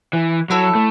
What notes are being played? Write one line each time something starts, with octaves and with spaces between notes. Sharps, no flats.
E3
F#3 E4 A4 C#5
A3